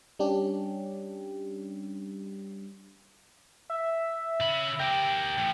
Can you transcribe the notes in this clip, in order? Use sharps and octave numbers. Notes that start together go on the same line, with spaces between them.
G3 C#4 D4 G4
E5
C#3 B5
G4 A#4 G5
E3 A3